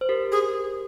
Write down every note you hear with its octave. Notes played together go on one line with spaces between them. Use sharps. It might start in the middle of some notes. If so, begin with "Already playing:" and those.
C5
G4 A#4
G#4